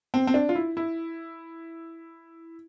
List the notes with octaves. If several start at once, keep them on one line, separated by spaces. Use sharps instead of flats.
C4
C4
D4
F4
E4
E4